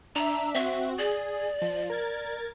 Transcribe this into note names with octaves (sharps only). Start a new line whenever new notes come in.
D4 E5 A#5
C4 F#4 E5
G#4 D5
F3
A#4 G#6 A6